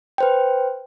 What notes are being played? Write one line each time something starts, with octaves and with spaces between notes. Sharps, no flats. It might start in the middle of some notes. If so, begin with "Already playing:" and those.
B4 C5 G5